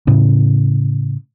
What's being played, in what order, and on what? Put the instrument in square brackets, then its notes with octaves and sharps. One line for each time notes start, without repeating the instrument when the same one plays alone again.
[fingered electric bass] A2 C#3